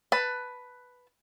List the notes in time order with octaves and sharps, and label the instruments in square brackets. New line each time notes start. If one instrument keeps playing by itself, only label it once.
[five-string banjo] B4 A5